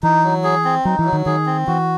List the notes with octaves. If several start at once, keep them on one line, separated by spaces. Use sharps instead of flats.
E3 D#4
F#3
G#4
C4
F#3 D#4
E3
F#3
D#3
D#3 G#4
C4
E3 F#4